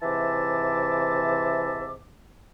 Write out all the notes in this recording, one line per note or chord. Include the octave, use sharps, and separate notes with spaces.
G#2 C3 E3 E5 A5 D6